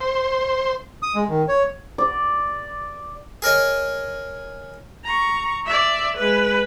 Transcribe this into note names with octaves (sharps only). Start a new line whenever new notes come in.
C5
D#6
G#3
D#3
C#5
D5
G#4 A#4 C#5 D#5
A#5 C#6
D5 E5
G#3 B4